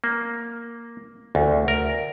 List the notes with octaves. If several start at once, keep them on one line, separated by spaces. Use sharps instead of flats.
A#3
D2
A#4